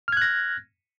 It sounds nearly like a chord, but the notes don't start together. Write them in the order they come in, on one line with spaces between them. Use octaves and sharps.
F6 G#6 F#6 A#6